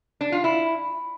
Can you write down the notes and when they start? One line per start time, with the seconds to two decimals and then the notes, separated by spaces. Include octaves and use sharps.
0.21 D4
0.32 F4
0.44 E4